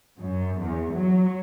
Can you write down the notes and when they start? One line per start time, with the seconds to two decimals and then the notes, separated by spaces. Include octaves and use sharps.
0.19 F#2
0.60 E2
0.94 F#3